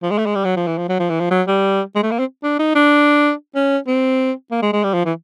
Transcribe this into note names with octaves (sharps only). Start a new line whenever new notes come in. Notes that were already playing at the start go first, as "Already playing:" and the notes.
F3
G#3
A3
G#3
G3
F#3
F3
E3
F3
F#3
F3
E3
F3
F#3
G3
G#3
A3
A#3
C4
D4
D#4
D4
C#4
C4
A#3
G#3
G#3
G3
F3
E3